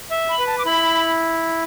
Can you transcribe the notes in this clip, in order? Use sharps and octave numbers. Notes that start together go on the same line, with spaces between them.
E5
B5
B4
A5
D6
E4 B5